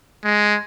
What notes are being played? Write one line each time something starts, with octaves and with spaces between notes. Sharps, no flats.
G#3